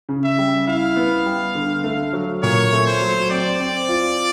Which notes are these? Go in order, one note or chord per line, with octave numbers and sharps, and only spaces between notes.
C#3
E5
G3
E4 F5
B3
G3
D3
A3
F#3
A#2 C#5
A3
C5
F#3
C4 D5
C4
F4